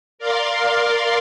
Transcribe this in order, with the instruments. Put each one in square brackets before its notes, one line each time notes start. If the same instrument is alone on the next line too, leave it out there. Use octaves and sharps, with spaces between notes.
[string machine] A#4 D5 F5 C6